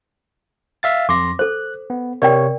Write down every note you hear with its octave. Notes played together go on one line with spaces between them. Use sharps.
E5 F5 A6
F2 C6 D6 A#6
A4 C5 F#6
B3
C3 A#4 C#5 D5 G5